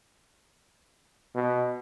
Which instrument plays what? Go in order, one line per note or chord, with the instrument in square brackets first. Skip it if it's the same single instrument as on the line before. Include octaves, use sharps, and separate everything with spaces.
[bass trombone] B2